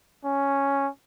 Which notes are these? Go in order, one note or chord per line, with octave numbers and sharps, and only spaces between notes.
C#4